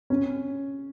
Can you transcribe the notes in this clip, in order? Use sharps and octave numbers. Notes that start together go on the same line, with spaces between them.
C#4